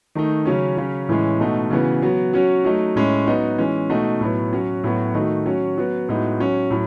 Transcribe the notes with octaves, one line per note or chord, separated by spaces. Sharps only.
D#3 A3 D#4
C#3 F#3 C#4
C#3 F#3 C#4
A2 E3 G#3 C#4
B2 A3 D#4 F#4
C#3 E3 B3 F#4
F#3 B3 F#4
F#3 C#4 F#4
F#3 A3 D#4
A2 G#3 C#4
F#3 B3 D#4 F#4
E3 G#3 C#4
B2 A3 D#4 F#4
A2 F#3 B3
F#3 C#4 F#4
A2 F#3 B3 F#4
D#3 A3 D#4 F#4
F#3 C#4 F#4
F#3 B3 F#4
A2 G#3 B3 D#4 F#4
F#3 C#4 F#4
A2 F#3